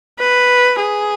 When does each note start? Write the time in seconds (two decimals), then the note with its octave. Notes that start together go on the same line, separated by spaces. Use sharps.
0.19 B4
0.80 G#4